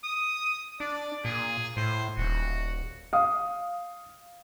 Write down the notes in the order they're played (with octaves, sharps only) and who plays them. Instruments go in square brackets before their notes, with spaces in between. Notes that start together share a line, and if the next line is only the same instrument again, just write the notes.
[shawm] D#6
[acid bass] D4 [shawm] D5
[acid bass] A#2 [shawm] G#4
[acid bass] A2 [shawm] C5
[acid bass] D#1 [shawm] F#4
[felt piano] F5 D#6